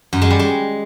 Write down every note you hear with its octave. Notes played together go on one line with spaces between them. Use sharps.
F#2
G#3
G3
G#3